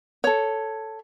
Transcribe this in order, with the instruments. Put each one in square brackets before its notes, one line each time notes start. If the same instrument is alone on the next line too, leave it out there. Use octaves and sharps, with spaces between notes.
[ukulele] A4 C#5